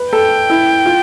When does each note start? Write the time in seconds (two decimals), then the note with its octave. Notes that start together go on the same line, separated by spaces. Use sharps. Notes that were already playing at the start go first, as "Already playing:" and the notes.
Already playing: B4
0.13 A4 G5
0.50 E4
0.86 F4